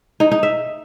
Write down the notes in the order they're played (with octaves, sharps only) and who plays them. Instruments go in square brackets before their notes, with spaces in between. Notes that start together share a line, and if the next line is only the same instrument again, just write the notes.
[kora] D#4
D#4
E5